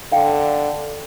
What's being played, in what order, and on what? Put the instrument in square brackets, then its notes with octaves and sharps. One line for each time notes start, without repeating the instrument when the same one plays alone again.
[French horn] D3 [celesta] F5 G5